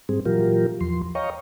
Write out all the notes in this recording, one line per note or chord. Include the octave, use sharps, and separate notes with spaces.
G#2 G3 C4 G#4
A#2 E3 F#3 F4 G4 A#4
E2 F3 C6
C#5 D#5 F5 G5 A#5 C#6